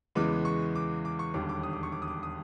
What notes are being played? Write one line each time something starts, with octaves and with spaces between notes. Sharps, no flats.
E2 C#3 E3 G#3 B3 D6
C#6
D6
D6
C#6
E1 D#2 D3 G3 D6
D6
D#6
D6
C#6
D6
D#6
D6
D#6